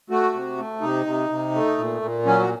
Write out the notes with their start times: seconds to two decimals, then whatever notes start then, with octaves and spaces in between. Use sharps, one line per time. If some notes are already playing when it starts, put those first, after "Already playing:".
0.10 A3 F#4
0.34 C3
0.57 A3
0.81 C3 D#4
1.06 C3
1.30 C3
1.54 A3
1.78 A#2
2.02 A#2
2.25 F#3 C#4
2.40 F#4